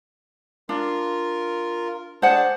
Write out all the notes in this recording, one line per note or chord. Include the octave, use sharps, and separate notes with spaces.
D4 F4 A#4
D4 G#4 C5 F#5 A5